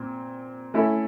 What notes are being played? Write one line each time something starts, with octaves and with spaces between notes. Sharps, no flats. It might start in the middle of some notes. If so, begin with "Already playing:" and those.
Already playing: A#2 C4
A3 C#4 E4 A4